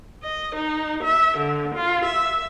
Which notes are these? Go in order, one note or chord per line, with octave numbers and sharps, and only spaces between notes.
D#5
D#4
E5
D3
F4
E5